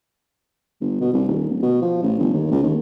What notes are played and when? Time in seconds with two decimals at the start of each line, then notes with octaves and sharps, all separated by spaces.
0.81 G1
1.01 B2
1.13 C2
1.28 D#1
1.49 D1
1.63 B2
1.82 F3
2.03 A1
2.18 G1
2.33 D#2
2.51 C#2
2.63 D#2